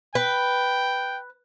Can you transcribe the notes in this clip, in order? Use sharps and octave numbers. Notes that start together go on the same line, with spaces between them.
B4 G5